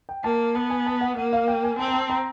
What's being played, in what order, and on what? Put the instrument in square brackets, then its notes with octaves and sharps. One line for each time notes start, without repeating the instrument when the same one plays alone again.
[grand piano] G5
[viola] A#3 [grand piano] A5
[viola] B3 [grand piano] A5
[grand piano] G#5
A5
F#5
[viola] A#3 [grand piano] F#5
[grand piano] F5
G5
G#5
[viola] C4 [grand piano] A5
[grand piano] A#5
A5
A#5